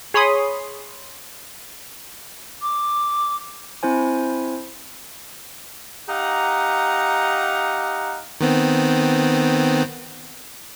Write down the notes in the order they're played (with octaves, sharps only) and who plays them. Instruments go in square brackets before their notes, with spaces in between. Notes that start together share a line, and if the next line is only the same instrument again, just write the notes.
[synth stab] G#4 C#5 B5 C6 D#6
[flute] D6
[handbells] C4 E4 C5 G#5
[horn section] D#4 G4 D#5 F5 F#5 A#5
[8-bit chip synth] D#3 B3 C4